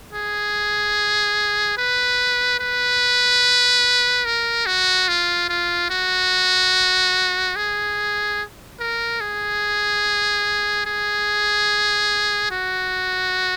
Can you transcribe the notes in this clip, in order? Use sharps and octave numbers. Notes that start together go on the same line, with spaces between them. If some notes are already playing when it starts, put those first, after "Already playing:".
G#4
B4
B4
A#4
F#4
F4
F4
F#4
G#4
A#4
G#4
G#4
F#4